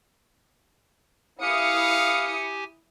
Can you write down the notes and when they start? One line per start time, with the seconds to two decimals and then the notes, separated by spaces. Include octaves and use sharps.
1.42 E4 G4 F5 G#5 D#6 C#7